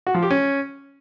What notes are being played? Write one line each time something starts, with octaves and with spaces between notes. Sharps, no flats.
F#4
F3
G4
C#4